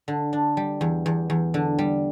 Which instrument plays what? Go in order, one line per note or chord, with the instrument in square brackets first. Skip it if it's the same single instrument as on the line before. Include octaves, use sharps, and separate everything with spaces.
[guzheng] D3
D4
G3
E2
E2
E2
D3
G3